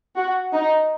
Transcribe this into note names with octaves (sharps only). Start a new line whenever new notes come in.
F#4
D#4